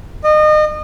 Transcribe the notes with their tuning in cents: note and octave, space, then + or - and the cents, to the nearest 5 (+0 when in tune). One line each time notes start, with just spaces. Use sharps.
D#5 -30